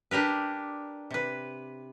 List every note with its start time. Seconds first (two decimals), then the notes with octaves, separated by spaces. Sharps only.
0.11 D4 G4 A#4 B4
1.11 C3 B4